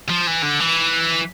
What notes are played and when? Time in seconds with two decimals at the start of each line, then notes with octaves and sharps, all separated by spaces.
0.10 F3
0.27 E3
0.43 D3
0.60 E3